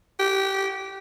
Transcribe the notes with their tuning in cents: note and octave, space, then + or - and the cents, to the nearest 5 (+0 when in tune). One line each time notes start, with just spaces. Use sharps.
G4 -15